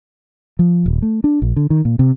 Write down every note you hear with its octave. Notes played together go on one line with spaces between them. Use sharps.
F3
D#1
A3
D4
A#1
D3
D#3
A#2
C3